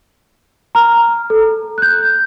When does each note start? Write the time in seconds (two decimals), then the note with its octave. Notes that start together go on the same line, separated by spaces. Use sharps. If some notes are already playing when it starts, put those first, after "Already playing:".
0.75 A#5 F6
1.30 A4
1.78 F#6 G6